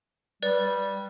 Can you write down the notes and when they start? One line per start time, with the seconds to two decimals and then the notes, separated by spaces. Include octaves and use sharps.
0.43 G3 B4 D5